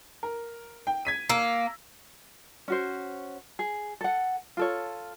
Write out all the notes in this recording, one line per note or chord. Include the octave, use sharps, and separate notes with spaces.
A#4
G5
G#6 B6 D#7
A#3 A#5 E6
C#4 F#4 C5
G#4
A4 F#5
F4 A4 C#5